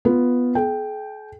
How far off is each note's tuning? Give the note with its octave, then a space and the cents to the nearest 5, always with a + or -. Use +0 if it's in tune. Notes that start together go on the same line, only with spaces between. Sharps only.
B3 +0 F4 +0
G#4 +45 G5 +0